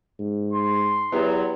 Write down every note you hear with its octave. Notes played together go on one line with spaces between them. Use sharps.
G#2
C6
E2 F#3 B3 E4 G4